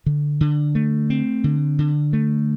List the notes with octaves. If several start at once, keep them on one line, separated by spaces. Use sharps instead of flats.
D3
D3
A3
C4
D3
D3
A3